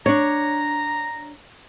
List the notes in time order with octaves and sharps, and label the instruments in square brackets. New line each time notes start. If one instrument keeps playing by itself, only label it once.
[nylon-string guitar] D4 C#5 [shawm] A#5